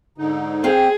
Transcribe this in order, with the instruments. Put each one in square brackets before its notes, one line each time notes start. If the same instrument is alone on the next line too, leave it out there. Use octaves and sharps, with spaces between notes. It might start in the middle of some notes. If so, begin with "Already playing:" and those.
[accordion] G#2 D3 D#4
[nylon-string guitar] C4 F5 G5 [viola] G#4